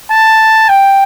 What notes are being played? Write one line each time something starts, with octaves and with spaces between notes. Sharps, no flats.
A5
G5